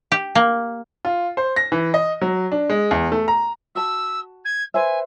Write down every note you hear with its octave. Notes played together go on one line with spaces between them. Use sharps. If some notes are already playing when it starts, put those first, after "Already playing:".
G4
A#3
F4
C5
A#6
E3
D#5
F#3
D4
G#3
E2
A3
A#5
F#4 A5 E6
G#6
B4 C5 E5 G#5